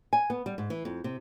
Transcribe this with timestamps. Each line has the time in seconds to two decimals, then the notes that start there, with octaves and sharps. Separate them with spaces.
0.13 G#5
0.30 B3
0.46 G3
0.58 G#2
0.70 E3
0.85 F2
1.04 C3